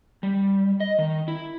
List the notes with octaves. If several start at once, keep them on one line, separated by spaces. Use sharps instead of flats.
G3
D#5
D#3
E4